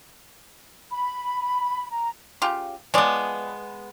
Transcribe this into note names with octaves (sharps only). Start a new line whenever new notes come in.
B5
A#5
C#3 F4 G4
F3 G#3 B3 C#5 D5